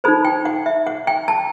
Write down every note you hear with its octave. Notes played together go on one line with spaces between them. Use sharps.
D#4 A4 C5 B5
G5
F#5
E5
F#5
G5
A5